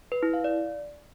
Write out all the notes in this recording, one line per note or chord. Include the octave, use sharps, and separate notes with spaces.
B4
E4
F5
D5